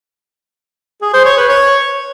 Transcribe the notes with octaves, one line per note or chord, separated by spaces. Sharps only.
G#4
C5
C#5
B4
C#5